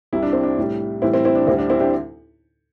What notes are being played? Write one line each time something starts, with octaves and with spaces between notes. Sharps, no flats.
C2 C3 G3 E4
D4
C4
D4
A2 G3
A2 E3 G3 C4 E4
C4 E4
C4 E4
D4
D2 D3 G3 C4
D4
C4 E4
D4 G4